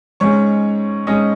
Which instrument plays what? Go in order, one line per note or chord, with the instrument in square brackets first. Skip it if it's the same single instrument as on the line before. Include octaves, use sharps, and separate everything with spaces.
[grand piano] G#2 G#3 C#4 C#5 C#6
G#2 G#3 C#4 D#5 D#6